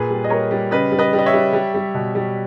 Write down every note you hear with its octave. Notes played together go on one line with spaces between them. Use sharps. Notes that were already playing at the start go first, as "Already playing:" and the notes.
Already playing: A#2 G#4 B4
G3
D#5
G3 A#4 C#5
G3
C#3 B4 D#5
G3
B4 D#5
G3
D#5
C#5 E5
G3
G3
G3
B2
G3